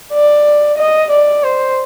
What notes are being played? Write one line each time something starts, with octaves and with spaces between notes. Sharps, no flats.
D5
D#5
D5
C5